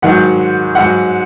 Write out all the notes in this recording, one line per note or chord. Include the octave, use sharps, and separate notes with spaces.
G#2 D#3 F#3 F#5
G#2 F#3 F#5